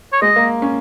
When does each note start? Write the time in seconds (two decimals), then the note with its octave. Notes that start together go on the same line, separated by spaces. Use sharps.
0.13 C#5
0.22 G#3 D#5
0.36 A#3
0.62 C#4